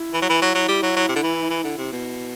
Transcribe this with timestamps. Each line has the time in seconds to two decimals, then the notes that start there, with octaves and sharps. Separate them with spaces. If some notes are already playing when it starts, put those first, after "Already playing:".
Already playing: E4
0.14 E3
0.22 F#3
0.29 E3
0.42 F#3
0.55 F#3
0.68 G3
0.83 F#3
0.96 F#3
1.08 C3
1.16 D3
1.23 E3
1.50 E3
1.64 D3
1.78 C3
1.92 B2